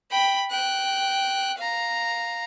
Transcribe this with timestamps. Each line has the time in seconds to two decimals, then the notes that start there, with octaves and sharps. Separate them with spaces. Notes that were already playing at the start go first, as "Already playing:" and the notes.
0.10 G5 B5
0.51 G5 F#6
1.58 F5 A#5